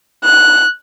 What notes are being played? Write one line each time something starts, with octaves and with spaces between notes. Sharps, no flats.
F#6